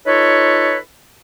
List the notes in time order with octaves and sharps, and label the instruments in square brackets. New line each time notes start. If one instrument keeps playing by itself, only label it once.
[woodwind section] D#4 F4 A4 B4 C#5